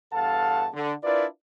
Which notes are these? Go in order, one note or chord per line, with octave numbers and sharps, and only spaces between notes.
E2 G2 A4 F5 F#5 A5
D3
D4 E4 F4 A#4 B4 D5